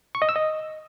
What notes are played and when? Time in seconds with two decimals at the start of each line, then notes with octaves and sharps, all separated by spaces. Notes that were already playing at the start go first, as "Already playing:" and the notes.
0.15 C#6
0.22 D#5
0.29 E6
0.36 D#5